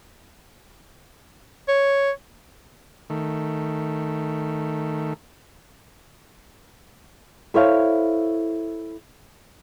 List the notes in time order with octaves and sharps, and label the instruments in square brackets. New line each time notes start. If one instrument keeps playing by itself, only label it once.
[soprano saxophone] C#5
[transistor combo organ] D#3 A3
[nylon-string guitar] E4 A4 C5 C#5 E5 F5